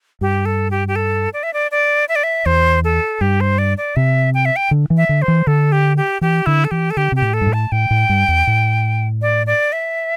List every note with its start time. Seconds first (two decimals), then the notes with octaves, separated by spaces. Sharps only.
0.21 G2 G4
0.45 A4
0.71 G4
0.88 G4
0.96 A4
1.33 D5
1.43 E5
1.53 D5
1.71 D5
2.09 E5
2.16 D5
2.23 E5
2.46 E2 C5
2.84 A4
3.21 G2 G4
3.41 C5
3.58 D5
3.78 D5
3.96 C3 E5
4.34 G5
4.45 E5
4.56 G5
4.71 D3
4.90 E3
4.97 E5
5.09 D3
5.22 C5
5.28 E3
5.47 D3 A4
5.72 G4
5.97 G4
6.21 E3 G4
6.46 D3 E4
6.64 A4
6.71 E3 G4
6.91 A4
6.97 D3 G4
7.12 C3 G4
7.22 A2
7.34 A4
7.41 G2
7.47 A2
7.53 A5
7.72 A2 G5
7.91 A2
8.09 G2
8.28 E2
8.47 A2
9.22 D5
9.47 D5
9.73 E5